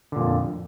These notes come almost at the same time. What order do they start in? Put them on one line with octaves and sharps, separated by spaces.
D3 A#2 F2